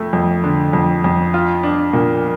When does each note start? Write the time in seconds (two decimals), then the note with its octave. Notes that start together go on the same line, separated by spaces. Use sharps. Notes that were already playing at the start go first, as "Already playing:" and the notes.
Already playing: F2 A3
0.13 F2
0.44 D3
0.73 F2
1.04 F2
1.34 F4
1.63 D4
1.93 A#2